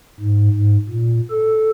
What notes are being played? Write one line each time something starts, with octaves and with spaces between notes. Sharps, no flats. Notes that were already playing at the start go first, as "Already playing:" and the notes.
G#2
G#2
A#2
A4